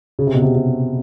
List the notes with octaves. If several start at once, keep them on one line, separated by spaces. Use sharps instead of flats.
C#3
C3
B2
C3
C3